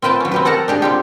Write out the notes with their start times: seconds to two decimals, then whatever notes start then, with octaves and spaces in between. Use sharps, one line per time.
0.02 C4 F4 B4 G5 A5
0.20 F#3 C#4
0.31 C4 G4 B4
0.45 A4 A#4 F#5 A5 A#5
0.68 D4 G4 G#4
0.82 C4 F4 G4